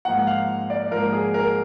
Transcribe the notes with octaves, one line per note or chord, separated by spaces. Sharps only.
G#2 F3 A#3 F#5
F5
D5
G#2 F3 A#3 A#4
G#4
A#4